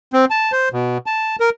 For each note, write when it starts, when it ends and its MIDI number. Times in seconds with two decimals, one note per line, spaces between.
0.13 0.25 60
0.30 0.52 81
0.52 0.69 72
0.72 0.98 47
1.06 1.36 81
1.40 1.50 70